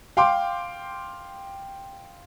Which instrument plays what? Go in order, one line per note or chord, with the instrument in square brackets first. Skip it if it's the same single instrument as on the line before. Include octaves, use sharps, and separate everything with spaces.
[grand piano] F5 G5 C6 D6